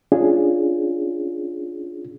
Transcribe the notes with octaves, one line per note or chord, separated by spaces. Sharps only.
C#4 D4 F4 G#4